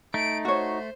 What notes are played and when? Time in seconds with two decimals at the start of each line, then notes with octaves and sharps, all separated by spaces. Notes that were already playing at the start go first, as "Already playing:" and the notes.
0.14 A3 D#4 D7
0.45 F#4 C5 C#5